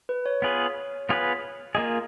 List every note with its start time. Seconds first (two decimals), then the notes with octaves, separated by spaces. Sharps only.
0.09 B4
0.26 C#5
0.42 B3 F4 G#4 B4
1.09 B3 F4 G#4 B4
1.75 A#3 F4 G#4 D#5